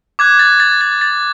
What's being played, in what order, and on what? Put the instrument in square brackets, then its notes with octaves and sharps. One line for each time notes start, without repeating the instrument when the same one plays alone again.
[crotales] D6 F#6 G#6
A6
A6
A6
A6